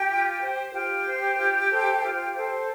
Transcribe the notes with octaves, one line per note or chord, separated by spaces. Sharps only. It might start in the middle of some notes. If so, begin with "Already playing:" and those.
Already playing: G4 G5
F4
C5
F4 G4 G5
C5
F4
A4 C5
F4
A4 C5